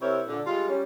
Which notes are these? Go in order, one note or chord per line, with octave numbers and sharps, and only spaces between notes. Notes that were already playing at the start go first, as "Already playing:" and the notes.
C3 C4 E4 A#4 C#5
A#2 D3
G3 G#3 F4
G3 C#4